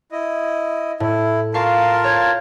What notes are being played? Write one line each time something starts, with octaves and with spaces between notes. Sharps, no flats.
E4 D#5
A2 E4
F4 A#4 F5 A5 C#6 C7
C#5 G6 G#6